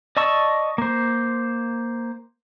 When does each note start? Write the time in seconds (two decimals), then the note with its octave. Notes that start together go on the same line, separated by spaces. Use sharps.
0.17 D5 D#5 A5 C#6 E6
0.78 A#3 C5